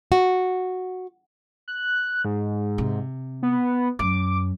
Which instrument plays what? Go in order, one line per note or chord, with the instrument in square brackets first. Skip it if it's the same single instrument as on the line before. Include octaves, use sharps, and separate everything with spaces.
[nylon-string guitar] F#4
[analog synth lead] F#6
G#2
[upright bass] C3
[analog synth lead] B3
[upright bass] F#2 [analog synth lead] D6